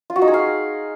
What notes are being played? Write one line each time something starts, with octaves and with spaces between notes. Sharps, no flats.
F4
F#4
D#4
G#4
F5